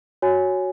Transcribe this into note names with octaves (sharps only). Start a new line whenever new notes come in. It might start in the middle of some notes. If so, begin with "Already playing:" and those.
F#4 C#5 G#5